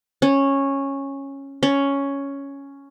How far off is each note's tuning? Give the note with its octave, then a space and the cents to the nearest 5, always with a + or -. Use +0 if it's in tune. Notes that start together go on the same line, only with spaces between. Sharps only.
C#4 -10
C#4 +5